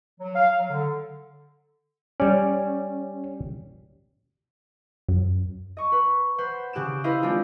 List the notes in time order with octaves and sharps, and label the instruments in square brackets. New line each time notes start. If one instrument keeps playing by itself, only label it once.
[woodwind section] F#3
F5
F#3
D3
[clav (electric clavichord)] G3 D5 [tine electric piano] C#4
[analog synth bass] F#2
[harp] D#5 C#6
B4
B4 C5 F#5
C#3 G4 F#6 D7 E7
E4 B4 C5 D#5 F5
G#3 C4 D4 F4 G4 G#4